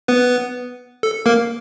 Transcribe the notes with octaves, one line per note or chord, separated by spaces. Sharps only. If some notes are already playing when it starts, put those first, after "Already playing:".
B3 B4
A4
A#3 A#4